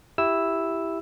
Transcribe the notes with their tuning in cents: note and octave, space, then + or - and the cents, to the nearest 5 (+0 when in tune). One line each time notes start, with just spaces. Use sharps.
E4 +0 G4 +0 E6 +0